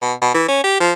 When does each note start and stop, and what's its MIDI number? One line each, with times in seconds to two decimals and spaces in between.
0.02 0.14 47
0.21 0.31 47
0.34 0.44 52
0.48 0.62 61
0.64 0.78 67
0.80 0.93 53